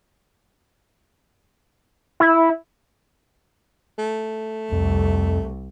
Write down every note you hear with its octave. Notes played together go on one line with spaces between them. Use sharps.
E4
A3
C2 F2